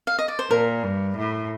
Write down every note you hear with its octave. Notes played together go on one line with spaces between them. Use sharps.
F5
D#5
D5
C5
A#2 A#4
G2
A2